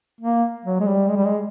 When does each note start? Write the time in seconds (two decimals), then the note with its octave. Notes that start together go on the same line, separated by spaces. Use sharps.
0.21 A#3
0.65 F#3
0.80 G#3
0.86 G3
1.09 G#3
1.17 G3
1.25 G#3